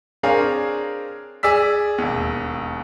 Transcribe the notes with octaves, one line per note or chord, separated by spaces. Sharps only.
C4 D4 G#4 A#4 C#5 F5
G#4 D5 E6 B6
E1 D#2